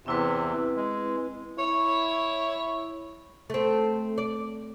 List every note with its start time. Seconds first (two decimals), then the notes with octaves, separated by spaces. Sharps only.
0.06 E2 C3 C4 E4 B4
0.76 G#3
1.59 E4 C#5
3.50 A3 C4
4.18 D5